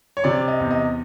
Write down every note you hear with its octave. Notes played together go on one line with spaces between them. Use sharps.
C#5
C3 D5
D#5
E2
D#5